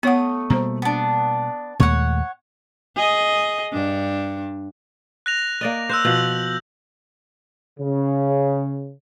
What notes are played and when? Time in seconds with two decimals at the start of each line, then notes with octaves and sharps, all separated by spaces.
0.03 A3 B3 C#5 F#5 D#6
0.50 B2 G3 A#3 C5 A#5
0.82 B3 D4
1.80 D#2 A#2 G#3 A3 C#5 F#5
2.96 G#4 D#5
3.72 G2 D4
5.26 F#6 A#6 F7
5.61 A#3 D5 D#5
5.89 C5 E6 F#6 G6
6.05 B2 F3 F#7
7.79 C#3